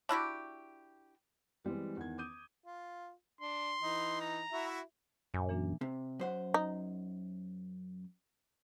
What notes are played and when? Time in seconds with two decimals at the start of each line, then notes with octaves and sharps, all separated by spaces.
0.09 D4 E4 F#4 G4
1.64 E3 G3 G#3 C4
1.97 E2 D#3 G#6
2.18 D6 D#6 G6 D#7
2.66 F4
3.41 D4 C6
3.82 E3 D#4
4.21 A#5
4.52 E4 F#4 E5
5.34 F#2 A#2 G#5 G6
5.49 E3 A#3 D4
5.81 C3
6.19 F#2 C5 F#5
6.54 D#4